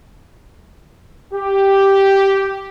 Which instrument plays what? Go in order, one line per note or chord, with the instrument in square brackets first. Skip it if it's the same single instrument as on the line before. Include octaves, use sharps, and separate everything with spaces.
[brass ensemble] G4